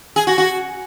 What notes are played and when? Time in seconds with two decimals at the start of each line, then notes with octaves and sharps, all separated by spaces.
0.16 G#4
0.27 F#4
0.38 F#4